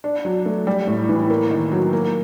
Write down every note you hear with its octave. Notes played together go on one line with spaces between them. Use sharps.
D4
F#3
A3
G3
A2
E3
A#3
D#3
F#3
A#3